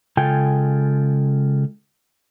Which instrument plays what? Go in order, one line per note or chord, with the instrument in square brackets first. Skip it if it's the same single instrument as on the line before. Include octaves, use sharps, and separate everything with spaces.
[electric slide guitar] C#3 G#3 F4 A4 G5 G#5